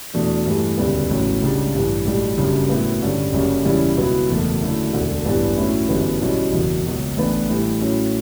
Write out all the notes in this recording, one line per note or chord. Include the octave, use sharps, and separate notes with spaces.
E2 B2 A3 D4
G2 E3 A3
E1 D2 C#3 G3 B3
A1 A2 F#3 C#4
C#2 C#3 G3 D4
A1 G2 E3
B1 A2 G3
F#1 F#2 C#3 G3 D4
A2 F#3 B3 E4
G2 D3 G3 C#4
F#1 F#2 C#3 G3 C#4
E2 C#3 G3 C#4 E4
C#2 B2 F#3 B3 E4
F#1 E2 B2 A3
F#2 D3 A3 E4
E1 D2 D3
A1 G2 E3 B3 D4
A2 F#3 C#4 E4
G1 F#2 E3 G3 B3
B1 B2 G3 C#4 E4
F#1 E2 B2
C#2 B2 F#3
A1 A2 E3 B3 D4
A2 E3 G3
A2 F#3 C#4 E4